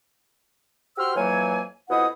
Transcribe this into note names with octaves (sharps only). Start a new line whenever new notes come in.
F#4 G4 C5 C6 E6 F6
F2 E3 F#3 A#3 C#5 G#5
F2 B2 E4 D#5 F#5 D#6